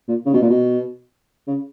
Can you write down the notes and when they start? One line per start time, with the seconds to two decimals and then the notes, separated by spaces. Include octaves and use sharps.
0.08 A#2
0.26 C#3
0.33 B2
0.42 A#2
0.50 B2
1.47 C#3